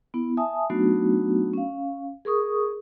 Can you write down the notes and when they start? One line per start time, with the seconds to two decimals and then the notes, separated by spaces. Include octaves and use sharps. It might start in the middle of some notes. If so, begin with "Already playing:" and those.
0.14 B3 E4
0.37 E5 G#5 A5 D#6
0.70 F#3 A3 B3 D4 D#4 F#4
1.53 C#4 F5
2.25 G#4 A#4 C#6 D#6